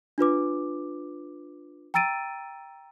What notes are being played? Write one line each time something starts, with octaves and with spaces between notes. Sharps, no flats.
D4 F4 B4 D6
G5 A#5 E6 A6 D7 D#7